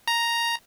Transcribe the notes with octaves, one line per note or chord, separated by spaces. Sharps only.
A#5